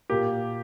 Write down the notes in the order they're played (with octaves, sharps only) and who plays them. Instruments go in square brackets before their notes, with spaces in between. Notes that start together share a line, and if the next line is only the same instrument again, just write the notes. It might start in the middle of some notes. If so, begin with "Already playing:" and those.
[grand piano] A#2 A#3 G4